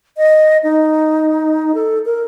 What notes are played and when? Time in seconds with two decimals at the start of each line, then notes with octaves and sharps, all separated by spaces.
0.17 D#5
0.63 D#4
1.75 A4
2.05 A#4